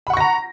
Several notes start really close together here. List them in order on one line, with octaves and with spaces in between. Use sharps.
B5 F#5 C#6 A#6 A#5